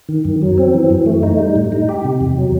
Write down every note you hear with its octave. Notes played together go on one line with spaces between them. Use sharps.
D#3
F#2
F#3
C4
E3
F#2
A3
D#4
G3
A2
D#4
G4
C3
E2
F#3